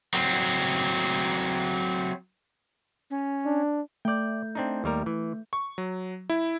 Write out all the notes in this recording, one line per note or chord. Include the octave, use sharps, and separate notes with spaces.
F#3 C4
C#4
D4
A3 D5 G5 G6
C4 D4 D#4
D#2 G3 A#4
E3
C#6
F#3
E4